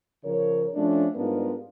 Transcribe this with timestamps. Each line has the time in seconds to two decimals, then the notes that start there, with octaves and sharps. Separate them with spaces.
0.24 C#3 F3 A#4 C#5
0.75 F3 A3 C#4 D4
1.16 G#2 G3 B3 D4 F4 A#4